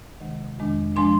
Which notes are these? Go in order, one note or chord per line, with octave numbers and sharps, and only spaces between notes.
D2 C3 D#3 G#3
F2 D#3 G#3 D4
F3 G#3 D4 C6